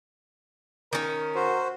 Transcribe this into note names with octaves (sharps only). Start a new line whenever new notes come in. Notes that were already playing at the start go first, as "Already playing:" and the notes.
D#3 C#4 A#4
F#4 C5